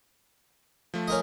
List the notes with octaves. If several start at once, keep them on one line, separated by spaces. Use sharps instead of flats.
F3 A3
C#4 A#4 D#5